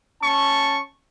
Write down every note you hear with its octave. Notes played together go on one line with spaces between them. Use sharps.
C#4 A5 C#6